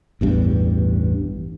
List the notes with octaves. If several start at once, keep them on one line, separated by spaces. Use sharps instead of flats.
A1 E2 G2